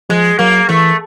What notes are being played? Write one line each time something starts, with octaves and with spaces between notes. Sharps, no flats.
F3 G#3
F#3 A#3
E3 A3